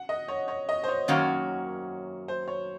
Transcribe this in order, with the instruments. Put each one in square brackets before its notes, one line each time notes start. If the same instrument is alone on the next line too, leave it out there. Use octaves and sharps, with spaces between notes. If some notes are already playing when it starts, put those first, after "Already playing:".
Already playing: [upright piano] F#5
D#5
C#5
C#5
D#5
C5
C#5
[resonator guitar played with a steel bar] F#2 D#3 A#3 C#4 F#4
[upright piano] C5
C#5